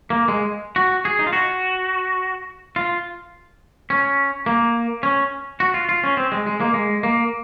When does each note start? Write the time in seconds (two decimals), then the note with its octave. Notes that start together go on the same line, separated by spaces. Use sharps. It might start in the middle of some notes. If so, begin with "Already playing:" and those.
0.10 A#3
0.28 G#3
0.76 F#4
1.05 G#4
1.19 D#4
1.27 F4
1.33 F#4
2.76 F4
3.90 C#4
4.46 A#3
5.03 C#4
5.60 F#4
5.74 F4
5.89 F4
6.04 C#4
6.17 C4
6.32 G#3
6.47 G#3
6.60 A#3
6.74 G#3
7.03 A#3